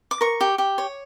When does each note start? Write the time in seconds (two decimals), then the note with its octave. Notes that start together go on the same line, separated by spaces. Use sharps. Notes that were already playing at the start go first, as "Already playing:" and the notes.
0.11 D6
0.21 A#4 C#6
0.41 G4
0.58 G4
0.78 C#5